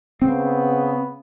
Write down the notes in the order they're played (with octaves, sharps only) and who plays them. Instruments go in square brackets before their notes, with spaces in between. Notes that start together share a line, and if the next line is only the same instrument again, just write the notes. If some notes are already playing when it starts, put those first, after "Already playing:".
[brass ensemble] C#3 B3 [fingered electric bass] C4